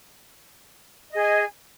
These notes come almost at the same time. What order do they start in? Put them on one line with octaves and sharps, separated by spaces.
D#5 G#4 G#5